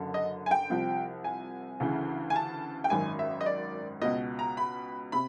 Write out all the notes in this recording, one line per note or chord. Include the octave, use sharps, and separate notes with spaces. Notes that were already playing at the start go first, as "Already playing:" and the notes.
Already playing: F#1 F#2 D3
D#5
G#5
G5
C2 C3 F3
G#5
D2 C#3 E3
G#5
A5
G5
G#1 F#2 D#3 G#5
E5
D#5
D5
C#2 B2 D#5
A#5
B5
C3 B5